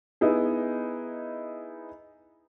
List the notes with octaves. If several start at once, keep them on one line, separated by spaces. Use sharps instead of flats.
B3 D#4 E4 G#4